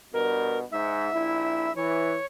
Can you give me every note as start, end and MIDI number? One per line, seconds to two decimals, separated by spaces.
0.13 0.63 43
0.13 0.63 47
0.13 0.58 70
0.72 1.09 44
0.72 1.72 76
1.12 1.71 34
1.12 1.71 64
1.76 2.16 52
1.76 2.26 73